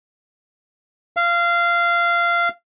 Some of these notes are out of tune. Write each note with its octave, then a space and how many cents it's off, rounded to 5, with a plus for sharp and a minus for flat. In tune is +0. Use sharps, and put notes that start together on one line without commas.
F5 -20